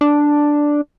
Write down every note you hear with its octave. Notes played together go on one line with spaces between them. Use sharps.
D4